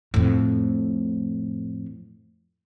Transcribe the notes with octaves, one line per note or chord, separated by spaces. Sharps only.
F2 A2